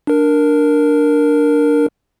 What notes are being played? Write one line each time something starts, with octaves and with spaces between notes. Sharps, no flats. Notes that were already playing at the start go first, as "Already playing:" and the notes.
D4 A#4